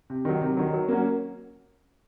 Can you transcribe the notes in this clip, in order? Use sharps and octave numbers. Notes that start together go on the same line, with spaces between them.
C3
D#3 F#3
C3
D#3 F#3
F#3
A#3 C#4 F#4